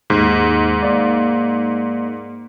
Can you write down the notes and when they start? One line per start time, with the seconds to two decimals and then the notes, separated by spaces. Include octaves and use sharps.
0.10 D#2 G#2
0.83 A#3 D5